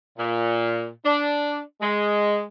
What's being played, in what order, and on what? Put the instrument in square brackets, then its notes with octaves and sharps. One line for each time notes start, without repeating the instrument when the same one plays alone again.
[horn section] A#2
D4
G#3